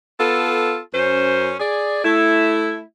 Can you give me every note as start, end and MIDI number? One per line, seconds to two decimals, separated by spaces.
0.19 0.78 59
0.19 0.78 65
0.19 0.78 69
0.94 1.54 42
0.94 1.54 61
0.94 1.54 72
1.60 2.03 68
1.60 2.03 74
2.04 2.80 57
2.04 2.80 64